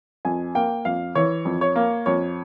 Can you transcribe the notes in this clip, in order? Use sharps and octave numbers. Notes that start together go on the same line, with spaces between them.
F2 G#5
A#3 G5
F2 F5
E3 C#5
F2
C#5
A#3
F2 C#5